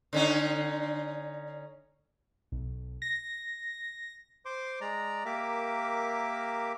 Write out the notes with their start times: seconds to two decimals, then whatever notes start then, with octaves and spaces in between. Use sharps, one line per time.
0.13 D3 C#4 D#4
2.52 B1
3.02 A#6
4.45 C5 C6 D6
4.81 G#3 D5 A#5
5.25 A#3 G4 A#4 E5 D6